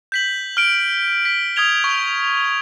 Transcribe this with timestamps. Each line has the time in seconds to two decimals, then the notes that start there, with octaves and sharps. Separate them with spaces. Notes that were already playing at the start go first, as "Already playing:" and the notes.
0.12 G6 B6 F#7
0.57 F6 D7
1.25 B6
1.56 D#6 F6 G#6 F7 G7
1.84 C#6